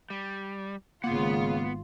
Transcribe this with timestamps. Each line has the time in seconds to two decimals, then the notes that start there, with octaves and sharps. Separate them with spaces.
0.10 G3
1.04 G#1 C#3 A#3 B3 F4 F#5